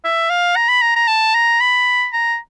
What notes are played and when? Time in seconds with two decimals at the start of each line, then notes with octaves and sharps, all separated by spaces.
0.04 E5
0.30 F5
0.56 A#5
0.69 B5
0.82 A#5
0.96 A#5
1.08 A5
1.34 A#5
1.60 B5
2.13 A#5